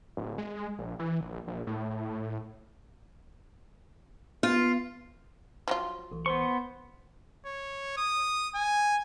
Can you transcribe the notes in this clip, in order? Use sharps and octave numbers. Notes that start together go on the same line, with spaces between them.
D1
G#3
A#1
E3
A#1
A#1
A2
B3 F4
F3 F#3 F4
B1 E3
B3 C5 C6 C#6
C#5
D#6
G#5